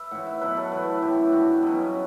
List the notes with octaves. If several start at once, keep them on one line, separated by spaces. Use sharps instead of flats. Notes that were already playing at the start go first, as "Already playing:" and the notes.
Already playing: B4 E5
A2 E3 F#5
E5
B2 F#3 B4
A4
A2 E3 B4
F#2 E3 G4
G2 E3 F#4
B2 F#3 B3
C#4